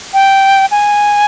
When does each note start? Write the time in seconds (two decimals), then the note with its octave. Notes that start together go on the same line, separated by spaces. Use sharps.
0.14 G5
0.71 G#5